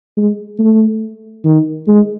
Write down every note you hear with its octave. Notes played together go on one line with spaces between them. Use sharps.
G#3
A3
D#3
G#3